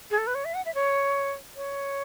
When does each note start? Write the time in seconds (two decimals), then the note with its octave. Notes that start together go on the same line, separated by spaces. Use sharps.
0.11 G#4
0.18 A4
0.27 B4
0.35 C#5
0.45 E5
0.54 F#5
0.65 E5
0.74 C#5
1.56 C#5